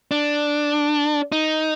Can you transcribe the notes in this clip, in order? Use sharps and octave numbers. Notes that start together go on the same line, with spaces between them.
D4
D#4